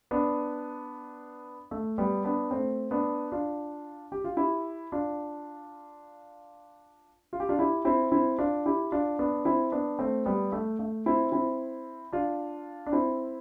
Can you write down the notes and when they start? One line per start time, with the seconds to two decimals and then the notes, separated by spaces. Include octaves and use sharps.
0.11 B3 D4
1.71 A3
1.98 G3 B3
2.24 B3 D4
2.51 A3 C4
2.91 B3 D4
3.32 D4 F4
4.12 G4
4.24 F4
4.37 E4 G4
4.92 D4 F4
7.33 F4
7.40 G4
7.49 D4 F4
7.59 E4 G4
7.85 C4 E4
8.12 C4 E4
8.39 D4 F4
8.66 E4 G4
8.92 D4 F4
9.19 B3 D4
9.45 C4 E4
9.72 B3 D4
9.99 A3 C4
10.26 G3 B3
10.52 A3
10.79 A3
11.06 C4 E4
11.32 C4 E4
12.12 D4 F4
12.86 D4
12.92 C4 E4